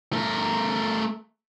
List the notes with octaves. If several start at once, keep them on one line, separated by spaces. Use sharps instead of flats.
A3 A#4